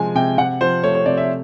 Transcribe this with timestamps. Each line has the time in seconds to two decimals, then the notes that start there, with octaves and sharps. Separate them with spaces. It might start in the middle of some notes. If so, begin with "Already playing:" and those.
Already playing: C3 F3 G#3 G#5
0.15 C3 G5
0.38 C3 F#5
0.61 F3 C5
0.83 A3 C#5
0.95 C#5
1.06 C3 D5
1.17 E5